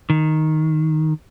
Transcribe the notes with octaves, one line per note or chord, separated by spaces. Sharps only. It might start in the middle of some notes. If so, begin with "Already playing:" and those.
D#3